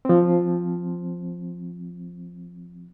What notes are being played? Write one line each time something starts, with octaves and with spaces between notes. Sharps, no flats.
F3 C4